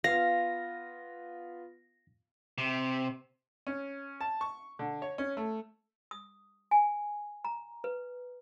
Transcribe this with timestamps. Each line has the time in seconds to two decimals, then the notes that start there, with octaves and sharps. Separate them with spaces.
0.04 B3 F4 F5 A#6
2.58 C3
3.67 C#4
4.21 A5
4.41 C#6
4.79 D3
5.02 C#5
5.18 C#4
5.37 A3
6.11 D#6
6.71 G#5
7.45 A#5
7.84 B4